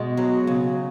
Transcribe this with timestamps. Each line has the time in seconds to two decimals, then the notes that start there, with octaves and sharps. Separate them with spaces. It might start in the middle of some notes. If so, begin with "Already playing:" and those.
Already playing: B2 G#3
0.17 F#3
0.47 C#3